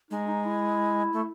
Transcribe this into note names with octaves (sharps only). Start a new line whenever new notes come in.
G#3 D#4
D#4
E4
A3